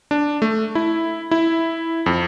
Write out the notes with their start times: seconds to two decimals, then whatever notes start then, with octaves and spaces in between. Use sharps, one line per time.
0.11 D4
0.42 A3
0.75 E4
1.31 E4
2.06 F2